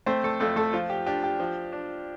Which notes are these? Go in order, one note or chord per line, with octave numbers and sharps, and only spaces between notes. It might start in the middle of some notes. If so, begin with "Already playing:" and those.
A3 C4 C5
A3 A4
F2 A3 A4
A3 A4
F3 F4
G4
D4 G4
G4
F3
D4